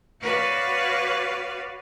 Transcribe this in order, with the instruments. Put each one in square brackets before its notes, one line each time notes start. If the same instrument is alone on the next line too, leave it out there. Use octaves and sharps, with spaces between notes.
[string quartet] F#4 B4 C#5 D5 F5